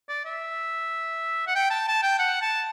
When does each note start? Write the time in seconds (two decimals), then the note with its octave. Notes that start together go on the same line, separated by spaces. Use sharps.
0.09 D5
0.25 E5
1.47 F#5
1.55 G5
1.70 A5
1.88 A5
2.03 G5
2.19 F#5
2.42 A5